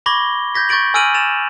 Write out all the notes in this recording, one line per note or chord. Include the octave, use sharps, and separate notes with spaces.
B5 C#6 D6 G#6 A#6 G7
G6 G#6 A#6 B6
C#6 G6 A6 D7 F#7
G#5 E6 F6 D7 D#7 F#7
A6 E7 F7